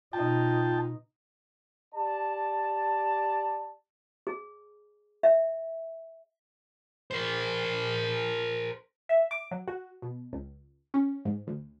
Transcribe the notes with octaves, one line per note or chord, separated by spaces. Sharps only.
B2 D#4 F4 G5 A5
G4 D5 A5
G#4
E5
A#4 C5
E5
D6
F#3
F#4
B2
C#2
C#4
G#2
D2